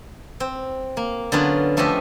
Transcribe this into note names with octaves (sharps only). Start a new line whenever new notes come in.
C4
A#3
D3 F#3 B3 C#4 F4
F3 A3 F4 G4 D#5 E5